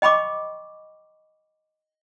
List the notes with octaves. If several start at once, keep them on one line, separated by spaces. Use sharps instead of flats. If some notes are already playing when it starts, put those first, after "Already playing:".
D#5 G5 B5 C#6 D6